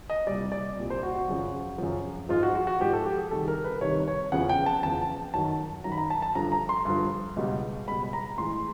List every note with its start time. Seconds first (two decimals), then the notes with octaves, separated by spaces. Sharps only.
0.10 D#5
0.26 C2 A#2 G3 D5
0.52 D5
0.77 C2 A#2 G3
0.90 C5
1.03 F#4
1.15 F#4
1.28 F#2 C#3 F3
1.78 F#2 C#3 F3
2.29 G#2 F3 G#3 F4
2.43 F#4
2.55 F#4
2.67 F#4
2.80 G#2 F3 G#3 G4
2.93 A4
3.06 G4
3.18 G#4
3.31 C2 C3 D#3 A4
3.48 A#4
3.64 B4
3.81 C2 C3 D#3 C#5
4.08 C#5
4.32 E2 C#3 F3 F#5
4.49 G5
4.66 A5
4.83 E2 C#3 F3 A5
5.34 F#2 D#3 F#3 A5
5.84 F#2 D#3 F#3 A#5
5.92 B5
5.98 A#5
6.10 A5
6.22 A5
6.35 G2 D3 F3 A#5
6.52 A#5
6.69 C6
6.85 G2 D3 F3
7.36 C#2 B2 G3
7.88 C#2 B2 G3 B5
8.03 B5
8.13 A#5
8.38 A2 E3 G#3 C6